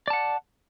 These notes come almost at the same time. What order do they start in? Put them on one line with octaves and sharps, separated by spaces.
D5 A5 F#5